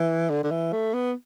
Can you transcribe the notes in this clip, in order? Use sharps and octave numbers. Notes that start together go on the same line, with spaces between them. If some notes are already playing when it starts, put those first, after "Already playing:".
Already playing: E3
D3
D3
E3
A3
B3